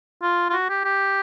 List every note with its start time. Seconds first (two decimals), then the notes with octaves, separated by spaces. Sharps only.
0.22 F4
0.50 F4
0.53 F#4
0.69 G4
0.85 G4